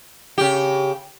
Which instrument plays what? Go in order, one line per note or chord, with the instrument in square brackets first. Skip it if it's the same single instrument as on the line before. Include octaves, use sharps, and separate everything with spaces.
[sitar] C#3 G4